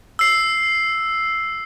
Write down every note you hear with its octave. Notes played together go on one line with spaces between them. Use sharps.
E6 C7